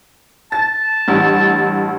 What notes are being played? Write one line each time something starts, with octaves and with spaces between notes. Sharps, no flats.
A5 A6
A1 G2